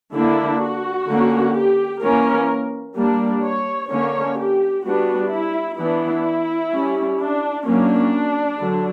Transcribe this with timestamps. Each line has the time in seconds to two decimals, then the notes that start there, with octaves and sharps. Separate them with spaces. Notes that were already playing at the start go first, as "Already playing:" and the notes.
0.14 D3 A#3 D4 E4
0.61 F#4
1.09 D3 A#3 C#4
1.56 G4
2.02 E3 A#3 C#4 A#4
2.97 G3 A#3 D4
3.43 C#5
3.90 D3 A#3 C#4 C#5
4.37 G4
4.84 G3 B3 D4 F#4
5.31 E4
5.79 E3 B3 D4 E4
6.72 G3 C#4
7.20 D4
7.66 F#3 A#3 C#4 D4
8.60 D3 F#3